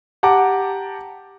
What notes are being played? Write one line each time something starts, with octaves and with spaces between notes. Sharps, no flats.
G4 F#5 A5 A#5 D6